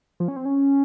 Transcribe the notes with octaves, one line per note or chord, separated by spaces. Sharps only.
F3
C#4
C4
C#4